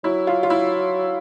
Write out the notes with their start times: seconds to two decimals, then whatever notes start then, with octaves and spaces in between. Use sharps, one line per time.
0.04 F#3 E4
0.27 F4
0.43 F4
0.50 E4